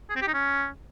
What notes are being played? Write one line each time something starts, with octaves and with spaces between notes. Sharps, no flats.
G#4
C4
G4
D#4
C#4